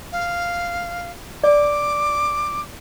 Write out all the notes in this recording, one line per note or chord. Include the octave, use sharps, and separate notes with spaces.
F5
D5 D6